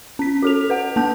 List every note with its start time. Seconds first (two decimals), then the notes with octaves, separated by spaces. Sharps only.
0.19 C#4 B6
0.43 F#4 A4 F7
0.70 B4 F#5
0.96 A#3 A5 G6